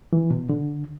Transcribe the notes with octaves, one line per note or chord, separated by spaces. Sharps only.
E3
B2
D3